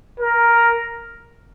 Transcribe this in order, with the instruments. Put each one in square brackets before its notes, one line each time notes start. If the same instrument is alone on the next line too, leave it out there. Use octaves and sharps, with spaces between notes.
[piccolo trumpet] A#4